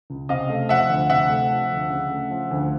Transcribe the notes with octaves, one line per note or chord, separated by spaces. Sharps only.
C#2
C3 D#5 F5
A3
F3 E5 F#5
D2
C3 E5 F#5
A3
F3
D2
C#3
A3
F3
D2